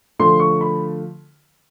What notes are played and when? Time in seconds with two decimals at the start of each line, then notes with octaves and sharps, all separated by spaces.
0.19 D3 F3 A3 C6
0.40 C#6
0.61 B5